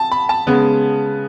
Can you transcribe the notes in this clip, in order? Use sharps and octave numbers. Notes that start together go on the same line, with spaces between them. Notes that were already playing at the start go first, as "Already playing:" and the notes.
Already playing: A5
B5
A5
C#3 G#3 B3